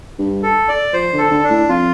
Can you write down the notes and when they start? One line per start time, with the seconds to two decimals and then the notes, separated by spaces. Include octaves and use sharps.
0.18 G2
0.43 A4
0.69 D5
0.93 F3 C5
1.13 D3
1.18 A4
1.31 D3
1.44 D4
1.50 A2
1.69 F2 F4